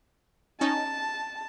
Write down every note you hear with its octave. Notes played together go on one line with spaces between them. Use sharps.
C#4 D#4 A5